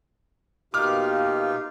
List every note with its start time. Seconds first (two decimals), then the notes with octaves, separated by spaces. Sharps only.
0.74 B2 A#3 D#4 F4 G4 D6 F6